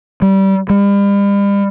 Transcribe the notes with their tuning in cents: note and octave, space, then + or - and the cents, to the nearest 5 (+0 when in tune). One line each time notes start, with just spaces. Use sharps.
G3 -20
G3 +40